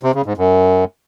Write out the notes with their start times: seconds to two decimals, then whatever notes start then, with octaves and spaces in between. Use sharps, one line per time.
0.03 C3
0.14 C#3
0.26 G#2
0.37 F#2